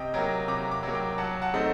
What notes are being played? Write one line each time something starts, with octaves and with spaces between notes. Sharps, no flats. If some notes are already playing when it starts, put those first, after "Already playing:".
Already playing: C3 D#5 G5
F#3 A#3 G5 A#5
C3 A#5 D6
A#5 D6
F#3 A#3
G5 A#5
F#3 F#5 A5
F#5 A5
A3 C4 D#4